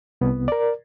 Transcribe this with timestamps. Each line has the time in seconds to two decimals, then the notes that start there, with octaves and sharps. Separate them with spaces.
0.21 C2 B3
0.48 A#4 D5